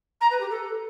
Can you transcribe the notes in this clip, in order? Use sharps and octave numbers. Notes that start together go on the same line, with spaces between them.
A#5
B4
G4
A4